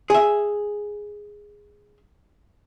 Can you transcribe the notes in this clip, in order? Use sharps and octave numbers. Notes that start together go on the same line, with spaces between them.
G#4 E5